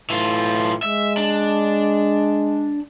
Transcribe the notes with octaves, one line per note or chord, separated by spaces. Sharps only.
A2 E3 F4
G#3 E5
D4